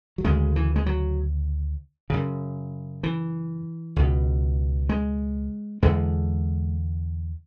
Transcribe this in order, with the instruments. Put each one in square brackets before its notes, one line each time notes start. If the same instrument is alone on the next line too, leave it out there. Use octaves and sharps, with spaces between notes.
[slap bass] F#3
D2 C#3 G#3
E3
G#3
F#3
F#2 C#3
E3
C#2 B2
G#3
E2 D3 G#3